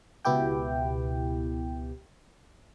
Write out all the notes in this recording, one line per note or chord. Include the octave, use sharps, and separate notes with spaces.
C#2 B2 B3 E4 G4 G5